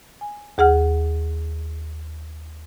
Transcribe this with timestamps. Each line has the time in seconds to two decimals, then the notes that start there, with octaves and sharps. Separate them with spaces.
0.21 G#5
0.58 D#2 G#4 F#5 F6